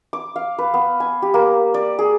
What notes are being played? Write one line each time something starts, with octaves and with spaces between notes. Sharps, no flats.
D6
F5
B4
B3
G#5
G4
A#3
D5
G#4